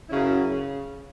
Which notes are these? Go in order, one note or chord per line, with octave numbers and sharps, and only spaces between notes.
F#2 C#3 F#3 C#4 E4
C#3